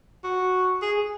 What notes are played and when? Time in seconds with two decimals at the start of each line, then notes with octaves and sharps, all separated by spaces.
0.24 F#4
0.82 G#4